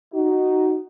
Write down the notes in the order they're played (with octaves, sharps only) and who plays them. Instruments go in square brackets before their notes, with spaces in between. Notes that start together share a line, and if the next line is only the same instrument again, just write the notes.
[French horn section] D#4 F#4